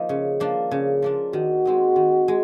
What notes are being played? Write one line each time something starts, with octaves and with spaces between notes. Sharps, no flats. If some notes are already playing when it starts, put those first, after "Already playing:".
Already playing: F3 A#3 D#4
C#3
F3 A#3 D4
C#3
F3 A#3 D4
D#3 F#4
G#3 C4 D#4
D#3
G#3